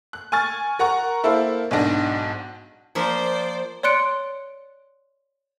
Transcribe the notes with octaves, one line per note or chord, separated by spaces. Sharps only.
F#6
G#5 C#6 F6 A6
A#4 F#5 A#5 C#6
A#3 E4 A4 C5 F5
B1 G#2 D4 A#6
F3 A#3 C5 D5 E5
C#5 D5 C6 F#6 C#7 D7